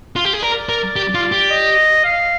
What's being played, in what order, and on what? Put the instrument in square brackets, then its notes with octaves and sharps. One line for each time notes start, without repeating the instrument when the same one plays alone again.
[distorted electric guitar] F4
G4
G#4
[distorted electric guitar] A#4 [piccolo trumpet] D5
[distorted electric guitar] A#4
G4
F4
G4
[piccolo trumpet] D#5
F5